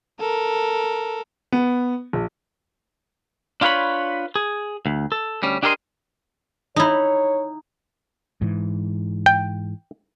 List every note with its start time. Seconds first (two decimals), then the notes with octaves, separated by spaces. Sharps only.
0.20 A4 A#4
1.52 B3
2.13 A#1
3.61 D4 F4 G4 B4 C#5 B5
4.36 G#4
4.86 D2
5.12 A4
5.43 D2 G3 C#4
5.63 D4 G4 G#4 A#4 D#5 C6
6.76 D#4 E4 C#5
8.41 G#2 E3
9.26 G5